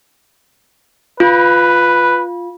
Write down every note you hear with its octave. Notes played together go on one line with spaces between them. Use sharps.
F4 B4